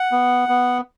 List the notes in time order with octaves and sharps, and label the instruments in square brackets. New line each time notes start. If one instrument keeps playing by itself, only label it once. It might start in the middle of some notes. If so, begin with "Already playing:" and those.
Already playing: [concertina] F#5
B3
B3